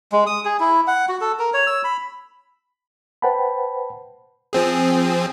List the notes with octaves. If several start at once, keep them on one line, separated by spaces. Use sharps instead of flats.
G#3
D#6
G#4
E4
F#5
F#4
A4
A#4
C#5
E6
B5
B4 C5 F#5 G5 A5 B5
F3 C4 G#4